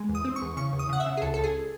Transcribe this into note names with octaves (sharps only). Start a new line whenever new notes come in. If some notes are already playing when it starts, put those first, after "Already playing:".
Already playing: G#3
E2
D#6
C4
C#6
E2
C#3 C#6
E2
D#6
C#3 F#5
E5
C#3
G#4
C#2 A4
A4
C#2
G#4